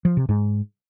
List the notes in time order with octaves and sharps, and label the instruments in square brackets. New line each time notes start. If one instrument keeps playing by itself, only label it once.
[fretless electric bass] F3
C3
G#2